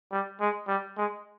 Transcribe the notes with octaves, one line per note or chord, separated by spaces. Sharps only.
G3
G#3
G3
G#3